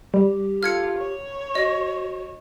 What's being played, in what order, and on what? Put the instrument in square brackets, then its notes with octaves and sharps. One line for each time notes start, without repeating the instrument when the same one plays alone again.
[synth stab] G3 [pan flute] G4
[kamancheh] F4 A4 [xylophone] F6 G#6 C#7
[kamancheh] C#5
[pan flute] F#4 [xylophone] D#5